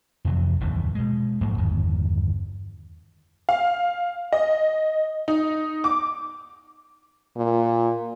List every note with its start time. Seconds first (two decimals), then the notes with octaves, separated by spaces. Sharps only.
0.25 F2 C3 E3 F#3
0.60 F1 D#2 G#2 E3
0.95 B2 G#3
1.41 A#1 G#2 F#3 A#3
1.58 G1 E2 D#3
3.49 F5
4.33 D#5
5.28 D#4
5.84 D6
7.36 A#2